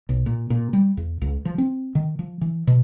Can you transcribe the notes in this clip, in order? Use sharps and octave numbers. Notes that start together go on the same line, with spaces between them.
B1
A#2
A#2
G3
E2
C#2
F3
C4
D#3
F3
E3
B2